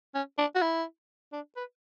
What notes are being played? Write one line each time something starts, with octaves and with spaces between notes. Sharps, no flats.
C#4
D4
F#4
E4
D4
B4